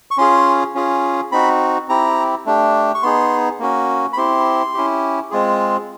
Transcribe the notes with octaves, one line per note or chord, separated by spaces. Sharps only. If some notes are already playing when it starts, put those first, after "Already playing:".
C#6
C#4 F4 G#4 C6
C#4 F4 G#4
C4 D#4 F#4 B5
C4 E4 G4 A#5
A3 D4 G4
C#6
B3 D#4 G#4 C6
A#3 C#4 F#4
B5
C4 E4 G4 C6
C#4 E4 G4
G#3 C4 F4 G#4